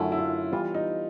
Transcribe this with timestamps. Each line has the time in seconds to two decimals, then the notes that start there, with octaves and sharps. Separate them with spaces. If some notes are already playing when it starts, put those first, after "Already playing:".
Already playing: F#2 D3 F#3 A3 E4 F4
0.12 E4
0.19 F4
0.52 E3 G3 B3 F4
0.75 D#4